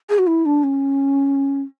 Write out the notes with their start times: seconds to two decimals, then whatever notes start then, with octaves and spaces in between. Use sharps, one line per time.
0.10 G#4
0.19 F#4
0.27 E4
0.46 D4
0.63 C#4